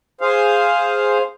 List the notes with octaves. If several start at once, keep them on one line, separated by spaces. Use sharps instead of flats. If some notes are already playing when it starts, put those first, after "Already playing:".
G#4 C5 F5